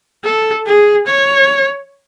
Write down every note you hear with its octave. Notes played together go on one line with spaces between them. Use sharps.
A4
G#4
C#5